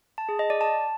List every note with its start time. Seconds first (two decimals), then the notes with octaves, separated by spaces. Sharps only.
0.18 A5
0.29 G#4
0.39 D#5
0.50 D5
0.61 A5